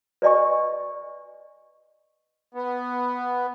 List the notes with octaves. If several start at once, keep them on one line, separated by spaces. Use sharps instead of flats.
B4 D5 D#5 G#5 C#6
B3